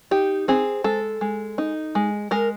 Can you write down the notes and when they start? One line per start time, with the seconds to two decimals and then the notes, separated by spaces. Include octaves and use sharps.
0.11 D#4 G4
0.48 C4 G#4
0.84 G#3 A4
1.21 G#3
1.58 D#4
1.95 G#3
2.31 G#3 A#4